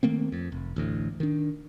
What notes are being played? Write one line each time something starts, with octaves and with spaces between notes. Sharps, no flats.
D#3 A3 A#3 C4
F2
F1
A1 D2 A2
D#3 D4